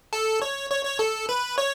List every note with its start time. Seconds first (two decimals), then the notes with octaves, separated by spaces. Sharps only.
0.13 A4
0.42 C#5
0.71 C#5
0.85 C#5
0.99 A4
1.29 B4
1.58 C#5